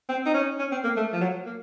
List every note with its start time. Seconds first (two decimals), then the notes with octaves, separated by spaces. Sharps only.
0.09 C4
0.26 D#4
0.34 C#4
0.59 C#4
0.71 C4
0.84 A#3
0.97 A3
1.13 F3
1.21 F#3
1.46 A#3